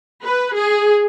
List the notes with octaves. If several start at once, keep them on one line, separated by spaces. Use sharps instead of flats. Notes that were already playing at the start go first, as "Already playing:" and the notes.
B4
G#4